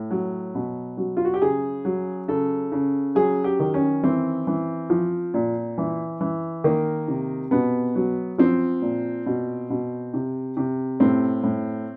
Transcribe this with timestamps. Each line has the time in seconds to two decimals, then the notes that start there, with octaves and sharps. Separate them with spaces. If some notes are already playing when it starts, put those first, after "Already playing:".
Already playing: A2
0.11 F#3
0.55 B2
0.97 F#3
1.17 F4
1.25 F#4
1.34 G4
1.42 C#3 G#4
1.85 F#3
2.28 C#3 A4
2.72 C#3
3.15 F#3 G#4
3.44 G4
3.60 D#3
3.74 C#4
4.03 E3 C4
4.47 E3
4.90 F3
5.34 A#2
5.78 E3
6.21 E3
6.64 D#3 A#3
7.08 C3
7.51 B2 B3
7.95 F#3
8.38 F3 C4
8.82 A#2
9.26 B2
9.70 B2
10.14 C3
10.57 C3
11.00 A2 C4
11.43 A2